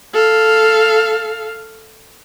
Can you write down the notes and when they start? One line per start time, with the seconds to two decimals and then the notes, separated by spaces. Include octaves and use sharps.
0.14 A4 F5